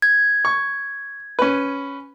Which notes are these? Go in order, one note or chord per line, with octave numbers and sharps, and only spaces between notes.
G#6
C#6
C#4 B4